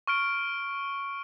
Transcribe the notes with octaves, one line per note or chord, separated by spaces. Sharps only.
C#6 F6 D7